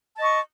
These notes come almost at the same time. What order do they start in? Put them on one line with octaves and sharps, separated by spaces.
A5 D#5 C#6